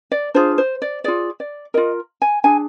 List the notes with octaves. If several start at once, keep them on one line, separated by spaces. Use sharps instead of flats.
D5
D4 F4 G#4 C5
C5
D5
F4 G#4 D5
D5
F4 A#4 D#5
G#5
D4 G#4 G#5